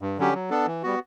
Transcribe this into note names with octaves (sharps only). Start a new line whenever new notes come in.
G2
D3 F#3 C#4 G4
F#3
B3 D4 A4
E3
G3 B3 F#4